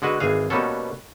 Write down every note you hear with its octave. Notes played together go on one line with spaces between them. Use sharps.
D3 G#3 F#4 B4
G#1 E3 G#4 F5
B2 G3 A#3 B3 C#4 A4